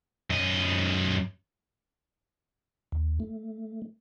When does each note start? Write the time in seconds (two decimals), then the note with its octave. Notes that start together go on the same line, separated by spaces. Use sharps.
0.30 F#2 D#5
2.92 D#2
3.20 A3